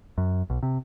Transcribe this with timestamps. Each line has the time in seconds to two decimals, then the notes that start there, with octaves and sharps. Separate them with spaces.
0.18 F#2
0.50 B1
0.63 C3